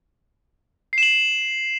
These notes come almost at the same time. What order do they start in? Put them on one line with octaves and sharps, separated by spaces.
C7 E7 F#7